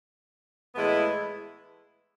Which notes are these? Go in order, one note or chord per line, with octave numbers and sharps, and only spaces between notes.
A2 E3 G#3 B3 E4